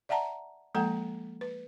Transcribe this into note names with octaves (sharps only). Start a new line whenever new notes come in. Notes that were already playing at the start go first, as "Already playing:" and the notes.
D5 E5 F#5 A5 A#5
F3 G#3 A#3 A4 F#5 A#5
B4